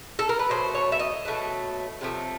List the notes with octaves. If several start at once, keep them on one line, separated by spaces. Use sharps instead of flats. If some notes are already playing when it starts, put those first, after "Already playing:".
A4
A#4
B4
B2 F#3 A3 C5
C#5
E5
D#5
B2 F#3 A3
C3 F3 A3